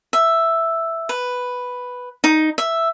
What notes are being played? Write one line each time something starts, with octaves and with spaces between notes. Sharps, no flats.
E5
B4
D#4
E5